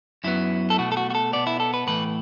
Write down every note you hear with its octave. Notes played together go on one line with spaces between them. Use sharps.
F#2 F#3 B3 E4
A4
B2 A3 F#4
A4
F#4
F#4
A4
B2 B3 D5
E4
A4
B4
A2 E3 A3 B4